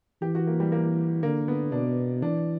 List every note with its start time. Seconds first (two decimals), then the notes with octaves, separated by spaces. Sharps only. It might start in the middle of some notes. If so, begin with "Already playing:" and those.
0.22 E3 G4
0.35 F#4
0.47 A#3
0.60 G3
0.72 A#3
1.23 D3 A#3
1.48 B3
1.72 B2 D4
2.22 E3 D4